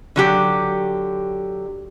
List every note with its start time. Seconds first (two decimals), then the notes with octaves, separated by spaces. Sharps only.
0.16 D3 F#3 G4